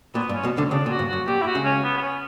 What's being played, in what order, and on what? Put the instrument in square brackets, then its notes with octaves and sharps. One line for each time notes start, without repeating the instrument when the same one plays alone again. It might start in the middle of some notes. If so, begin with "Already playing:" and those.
[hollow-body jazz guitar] A#2 [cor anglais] B3
[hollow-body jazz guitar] G2
[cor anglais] C#4
[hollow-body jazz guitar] B1 B2
D2 D3
[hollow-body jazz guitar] C#2 C#3 [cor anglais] D4
[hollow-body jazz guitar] A#2
[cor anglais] F#4
[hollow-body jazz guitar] G2
[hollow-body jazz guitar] F#2 [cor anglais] F#4
[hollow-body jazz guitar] A#2 [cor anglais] G4
[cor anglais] E4
F#4
[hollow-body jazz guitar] C#2 C#3
[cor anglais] C#4
B3
B3
C#4